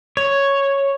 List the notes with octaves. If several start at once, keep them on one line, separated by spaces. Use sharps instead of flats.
C#5